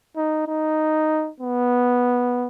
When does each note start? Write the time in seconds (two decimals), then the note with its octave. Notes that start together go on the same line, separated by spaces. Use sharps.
0.17 D#4
0.47 D#4
1.40 B3